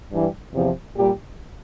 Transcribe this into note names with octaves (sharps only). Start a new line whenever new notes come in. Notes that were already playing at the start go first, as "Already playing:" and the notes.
G2 E3 G3
E2 C3 F3
A#2 G3 G4